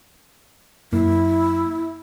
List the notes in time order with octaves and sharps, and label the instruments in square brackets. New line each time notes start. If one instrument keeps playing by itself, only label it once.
[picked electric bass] F#2 A#3 [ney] E4